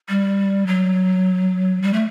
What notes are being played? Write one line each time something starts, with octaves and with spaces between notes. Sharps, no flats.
G3
F#3
G3
A3